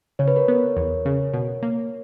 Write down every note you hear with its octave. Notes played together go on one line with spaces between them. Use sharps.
C#3 C#5
B4
A#4 C#5
B3
E2
C#3
B2
A#3